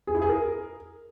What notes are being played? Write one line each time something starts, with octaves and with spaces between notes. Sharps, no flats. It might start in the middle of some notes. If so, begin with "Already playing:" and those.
G#4
E4
G#4
A#4